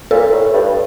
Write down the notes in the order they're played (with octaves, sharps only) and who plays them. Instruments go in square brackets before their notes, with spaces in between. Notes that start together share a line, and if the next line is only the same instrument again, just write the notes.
[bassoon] A#2 [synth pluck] A4
[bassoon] A2
G2